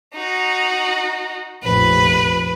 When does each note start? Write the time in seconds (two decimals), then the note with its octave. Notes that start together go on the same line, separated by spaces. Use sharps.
0.14 D#4 F#4
1.63 F1 A#1 F2 B4